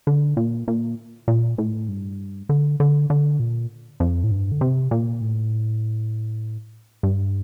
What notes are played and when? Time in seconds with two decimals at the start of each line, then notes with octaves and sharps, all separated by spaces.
0.07 D3
0.37 A#2
0.68 A#2
1.28 A#2
1.58 A2
1.88 G2
2.49 D3
2.80 D3
3.10 D3
3.40 A#2
4.00 F2
4.24 A2
4.31 G2
4.52 D3
4.61 C3
4.91 A#2
5.21 A2
7.03 G2